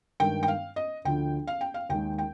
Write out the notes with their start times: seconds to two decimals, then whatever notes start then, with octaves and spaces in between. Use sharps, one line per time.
0.20 G2 D#3 G#3 G5
0.43 G5
0.48 F5
0.76 D#5
1.05 D2 D3 F3 G5
1.47 F5
1.61 G5
1.74 F5
1.89 D#2 D#3 G#3 G5
2.18 G5